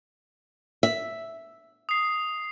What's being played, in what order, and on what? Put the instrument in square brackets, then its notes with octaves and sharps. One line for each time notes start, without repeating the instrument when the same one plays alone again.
[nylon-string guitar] E5
[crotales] D#6 C7